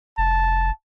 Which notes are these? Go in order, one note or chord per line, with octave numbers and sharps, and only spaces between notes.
F1 A5